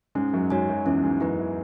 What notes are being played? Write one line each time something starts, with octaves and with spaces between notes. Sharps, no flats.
G#2 G#3 C#4
F#2 F#3
G#2 G#3 F#4 C#5 G#5
F#2 F#3
E2 E3 C#4
G#2 G#3
F#2 F#3 E4 B4
E3